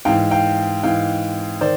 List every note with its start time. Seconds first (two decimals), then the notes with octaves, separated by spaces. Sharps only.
0.05 G#2 E3 F5 G5
0.31 F5 G5
0.83 G#2 E3 F5 G5
1.61 D#3 C5 D5